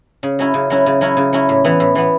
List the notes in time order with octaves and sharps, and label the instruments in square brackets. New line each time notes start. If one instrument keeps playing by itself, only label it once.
[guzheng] C#3
F#3 C#4 E4
C#3
F#3 C#4 E4
C#3
F#3 C#4 E4
C#3
F#3 C#4 E4
A2
E3 B3
A2
E3 B3